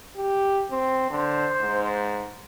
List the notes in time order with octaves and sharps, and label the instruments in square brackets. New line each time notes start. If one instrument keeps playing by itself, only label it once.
[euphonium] G4
C4
[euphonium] D3 [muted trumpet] C5
[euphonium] G#2